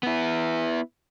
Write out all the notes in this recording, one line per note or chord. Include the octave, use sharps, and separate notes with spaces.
B3 E4